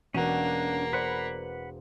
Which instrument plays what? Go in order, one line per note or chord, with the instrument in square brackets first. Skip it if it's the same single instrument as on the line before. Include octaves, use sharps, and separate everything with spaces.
[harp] E1 F#4 F#5 [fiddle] A#3 [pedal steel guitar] C#4 D4
[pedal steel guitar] B4 F#5 B5 [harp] C5 D5